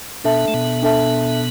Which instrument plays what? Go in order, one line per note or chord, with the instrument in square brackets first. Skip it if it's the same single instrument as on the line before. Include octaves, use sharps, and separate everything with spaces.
[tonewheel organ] B2 B3 [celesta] D4 A4 E5 A5
[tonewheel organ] A3
B2 B3
[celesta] D4 A4 E5 A5